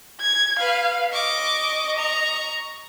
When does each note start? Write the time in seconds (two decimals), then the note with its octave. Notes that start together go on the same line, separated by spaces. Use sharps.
0.21 G#6
0.59 B4 F5
1.12 D#5 C#6 D6
1.97 A#5 C#6